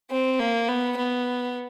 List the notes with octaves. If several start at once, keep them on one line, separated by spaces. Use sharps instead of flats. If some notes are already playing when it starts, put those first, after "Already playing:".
C4
A#3
B3
B3